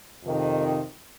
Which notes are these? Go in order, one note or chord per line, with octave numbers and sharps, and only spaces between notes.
F2 C3 D#3